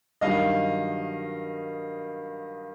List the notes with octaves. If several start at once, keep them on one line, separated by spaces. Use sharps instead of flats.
G2 D#3 F#3 D#5 F5